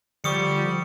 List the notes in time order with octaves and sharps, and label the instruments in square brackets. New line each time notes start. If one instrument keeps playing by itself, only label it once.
[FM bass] D3 [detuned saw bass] F3 [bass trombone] G3 [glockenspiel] C#6 D#6 C#7